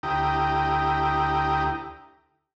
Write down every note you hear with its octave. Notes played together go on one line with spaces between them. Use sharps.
D2 E4 G4 G5 A#5 D#6